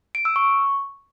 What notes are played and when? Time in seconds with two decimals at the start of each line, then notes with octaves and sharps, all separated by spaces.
0.15 D7
0.25 E6
0.36 C#6